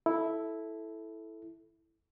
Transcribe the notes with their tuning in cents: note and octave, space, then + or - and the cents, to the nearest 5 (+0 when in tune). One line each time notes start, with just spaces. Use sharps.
E4 -5 A4 -10